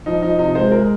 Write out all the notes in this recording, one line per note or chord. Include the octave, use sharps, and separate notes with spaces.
F3 D#4
F3 D#4
C3 D#4
G#3 C5
G#3 A#4